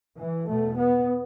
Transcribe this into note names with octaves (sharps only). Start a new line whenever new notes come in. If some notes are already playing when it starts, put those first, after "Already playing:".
E3
E2 B2 A3
B3